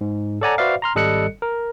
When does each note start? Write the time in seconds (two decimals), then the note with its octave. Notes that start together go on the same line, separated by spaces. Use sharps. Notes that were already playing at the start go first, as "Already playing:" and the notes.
0.01 G#2
0.41 A4 C#5 D5 F#5 G#5 A#5
0.58 F#4 B4 C5 D5 E5 F5
0.82 A#5 C6 F6
0.95 G#1 G3 A4 D#5 F#6 C#7
1.42 A#4